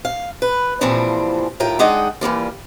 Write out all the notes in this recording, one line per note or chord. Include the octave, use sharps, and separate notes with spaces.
F5
B4
A#2 E3 F3 G3 C4 D4
D#2 A2 F4 A#4 G5
G#3 D4 D#4 D#5 F#5 G5
E3 G3 A#3 F4